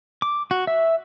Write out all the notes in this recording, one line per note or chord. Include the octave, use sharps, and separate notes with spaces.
D6
F#4
E5